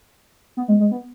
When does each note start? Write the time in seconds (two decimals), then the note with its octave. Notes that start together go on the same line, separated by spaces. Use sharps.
0.57 B3
0.68 G#3
0.80 G#3
0.91 B3